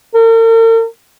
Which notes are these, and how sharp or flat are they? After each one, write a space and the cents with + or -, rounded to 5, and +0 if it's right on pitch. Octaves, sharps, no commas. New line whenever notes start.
A#4 -45